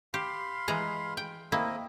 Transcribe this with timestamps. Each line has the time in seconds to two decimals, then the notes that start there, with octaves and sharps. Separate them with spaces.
0.14 G4 F5 B5 C6
0.68 E3 G#3 A#5
1.17 G5
1.52 A#3 C4 E4 D#5